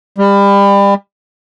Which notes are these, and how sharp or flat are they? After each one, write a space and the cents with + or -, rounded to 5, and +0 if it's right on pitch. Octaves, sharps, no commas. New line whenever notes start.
G3 +30